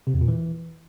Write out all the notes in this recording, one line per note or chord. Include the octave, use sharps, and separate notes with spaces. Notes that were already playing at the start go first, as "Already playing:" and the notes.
C3
E2
A#2
E3